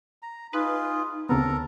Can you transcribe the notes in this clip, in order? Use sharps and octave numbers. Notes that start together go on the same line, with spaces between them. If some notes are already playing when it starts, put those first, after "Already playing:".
A#5
D#4 F4 G#4 B4
D2 C#3 B3 C4 A4 A#4 A#5